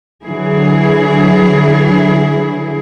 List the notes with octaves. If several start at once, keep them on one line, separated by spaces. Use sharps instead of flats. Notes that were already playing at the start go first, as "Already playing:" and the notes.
D3 E3 F#3 E4 G#4